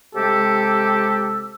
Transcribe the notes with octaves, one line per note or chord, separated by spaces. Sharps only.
C3 G#3 G4 A4 E6